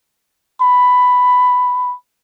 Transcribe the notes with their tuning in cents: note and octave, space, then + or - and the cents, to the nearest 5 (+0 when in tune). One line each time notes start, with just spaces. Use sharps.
B5 +10